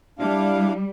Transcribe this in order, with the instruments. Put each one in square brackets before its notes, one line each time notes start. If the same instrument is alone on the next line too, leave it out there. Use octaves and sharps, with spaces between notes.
[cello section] G3 [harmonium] D4 E4 F5